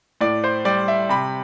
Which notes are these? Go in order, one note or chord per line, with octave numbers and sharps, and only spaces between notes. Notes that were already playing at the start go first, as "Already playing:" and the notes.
A2 D5
C5
G3 D5
E5
C3 B5